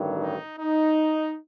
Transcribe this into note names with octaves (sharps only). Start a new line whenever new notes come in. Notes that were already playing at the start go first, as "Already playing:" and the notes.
Already playing: A1 G2 D#3 F#3
D#4
D#4